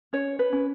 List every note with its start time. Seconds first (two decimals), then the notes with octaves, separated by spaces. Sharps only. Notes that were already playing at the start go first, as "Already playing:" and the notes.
0.13 C#4 C#5
0.39 B4
0.53 C#4